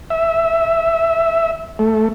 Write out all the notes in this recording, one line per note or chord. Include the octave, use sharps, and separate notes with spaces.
E5
A3